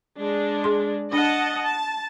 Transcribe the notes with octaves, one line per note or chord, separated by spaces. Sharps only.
G#3 D4
G#4 C6
D4 D#5 F#5 A5
A5